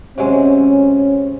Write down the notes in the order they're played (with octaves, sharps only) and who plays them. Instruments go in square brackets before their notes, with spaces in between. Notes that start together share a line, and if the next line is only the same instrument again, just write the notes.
[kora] C3 F#3 G#3 [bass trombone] C#4